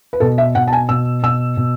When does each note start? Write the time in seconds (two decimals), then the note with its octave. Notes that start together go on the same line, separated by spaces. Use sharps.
0.13 B4
0.20 B2 A4
0.38 E5
0.55 B2 F#5
0.68 A5
0.73 G#5
0.89 B2 E6
1.22 B2 E6
1.57 B2